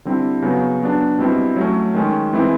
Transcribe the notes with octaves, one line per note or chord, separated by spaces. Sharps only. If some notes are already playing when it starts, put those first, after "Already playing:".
D3 G3 C4 E4
C#3 F#3 B3
F#3 B3 D4
B2 G3 C4 E4
F#3 A3 C#4
D#3 G#3 C#4
E3 G#3 C4 E4